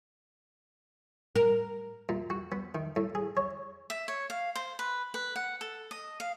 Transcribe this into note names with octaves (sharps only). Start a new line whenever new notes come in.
A#4
A#2
F#4
B3
D#3
A2
G#4
C#5
E5
C#5
F5
C5
B4
B4
F#5
A4
D#5
F5